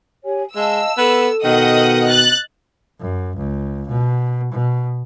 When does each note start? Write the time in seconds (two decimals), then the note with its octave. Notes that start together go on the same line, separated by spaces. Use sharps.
0.24 G4 C#5 G#5
0.56 G#3 D#5 F5 A5 E6
0.98 B3 A4
1.44 B2 D#3 D#5 F#5 D#6
2.09 F#6 A6
3.00 F#2
3.37 C#2
3.89 B2
4.52 B2